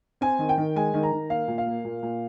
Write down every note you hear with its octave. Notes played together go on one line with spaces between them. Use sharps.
C4 G#5
D#3
G5
D#3
G#3 G#5
D#3
A#5
D#3
A#3 F5
A#2
F5
A#3
A#2
A#2